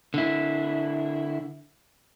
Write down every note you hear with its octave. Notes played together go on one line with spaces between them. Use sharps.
D3 E4